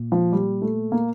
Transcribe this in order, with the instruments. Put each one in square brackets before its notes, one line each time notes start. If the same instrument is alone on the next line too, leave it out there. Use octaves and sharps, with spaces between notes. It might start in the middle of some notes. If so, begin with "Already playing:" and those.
Already playing: [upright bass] A#2
[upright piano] F3
G3
A3
A#3